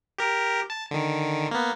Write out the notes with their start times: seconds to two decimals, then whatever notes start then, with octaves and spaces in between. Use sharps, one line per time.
0.18 G4 A#4
0.70 A5
0.91 D3 D#3
1.51 A#3 B3